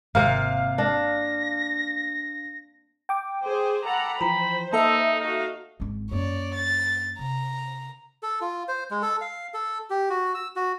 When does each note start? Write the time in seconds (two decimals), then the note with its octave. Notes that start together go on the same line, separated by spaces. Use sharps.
0.15 G#1 C3 A#3 F5
0.78 D4 A#6
3.09 G5 D6
3.43 G#4 C5
3.85 A4 F#5 A#5 B5
4.21 E3 F3 C5 G5 A#5 B5
4.73 A#3 D#4 A4 E5 A5 E6
5.20 D#4 F#4 F5
5.80 G#1 C4
6.11 F#2 A#3 C#5 D5
6.54 A6
7.19 C3 A#5
8.23 A4
8.41 F4
8.68 C5
8.91 G#3
9.03 A4
9.21 F5
9.54 A4
9.90 G4
10.10 F#4
10.35 E6
10.56 F#4